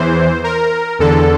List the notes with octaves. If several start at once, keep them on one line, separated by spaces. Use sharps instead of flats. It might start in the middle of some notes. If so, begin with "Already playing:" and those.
Already playing: E2 E3 C5
A#4
E2 D3 A4